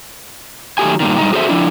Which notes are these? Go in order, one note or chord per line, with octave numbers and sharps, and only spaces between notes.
D#3 F#3 A3 G4 G#5
G2 A#2 D#3
G2 C#3 D#4
F#4 G#4 A4 C5 C#5 E5
F3 D4 E4